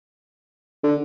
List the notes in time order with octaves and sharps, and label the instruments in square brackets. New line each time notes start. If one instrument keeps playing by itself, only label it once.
[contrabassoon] D3